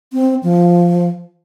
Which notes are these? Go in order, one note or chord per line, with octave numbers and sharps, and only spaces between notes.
C4
F3